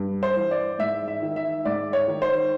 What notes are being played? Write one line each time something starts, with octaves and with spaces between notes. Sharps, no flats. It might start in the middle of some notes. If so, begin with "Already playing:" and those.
Already playing: G2
C5
E3
D5
G#2 E5
E5
D#3
E5
G#2 D5
C#5
D#3
C5